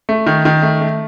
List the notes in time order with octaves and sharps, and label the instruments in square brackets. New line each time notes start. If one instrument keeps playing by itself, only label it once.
[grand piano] A3
D#3
D#3
A3
A3